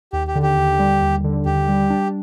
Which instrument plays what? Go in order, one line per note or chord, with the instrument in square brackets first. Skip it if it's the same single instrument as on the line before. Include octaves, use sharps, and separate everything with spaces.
[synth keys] D#2 [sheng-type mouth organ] G4
[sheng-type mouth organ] G4
[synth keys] D3
[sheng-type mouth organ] G4
[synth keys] D#2
G3
D#2
D3
[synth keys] D#2 [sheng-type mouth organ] G4
[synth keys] G3
D4